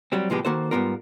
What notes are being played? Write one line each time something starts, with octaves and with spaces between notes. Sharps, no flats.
F#3 G3 C4
C2 A2 F3 G#3 B3 G4
D#3 A#3 F#4 A4 C5
G#2 B2 G3 B3 F4 A#4